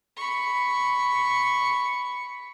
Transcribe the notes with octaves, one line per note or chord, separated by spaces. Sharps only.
B5 C#6